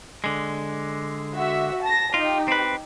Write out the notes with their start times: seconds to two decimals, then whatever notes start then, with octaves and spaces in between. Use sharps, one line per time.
0.24 D3 G#3
1.35 F#4 E5
1.83 A5 A#6
2.14 D#4 F4 G4
2.48 C4 B4